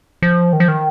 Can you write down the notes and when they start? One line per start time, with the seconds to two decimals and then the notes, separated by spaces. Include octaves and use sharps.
0.22 F3
0.53 D#3
0.60 F3
0.68 D#3